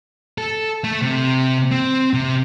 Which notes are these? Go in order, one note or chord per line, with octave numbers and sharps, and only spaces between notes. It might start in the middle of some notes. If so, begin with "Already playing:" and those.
A4
A3
C3
C4
C3